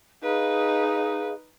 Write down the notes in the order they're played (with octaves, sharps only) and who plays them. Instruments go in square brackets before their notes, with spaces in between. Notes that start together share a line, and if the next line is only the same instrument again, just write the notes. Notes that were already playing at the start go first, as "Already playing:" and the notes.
[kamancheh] D#4 B4 [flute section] G#4 D#5 F5